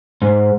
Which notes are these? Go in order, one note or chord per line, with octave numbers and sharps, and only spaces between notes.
G#2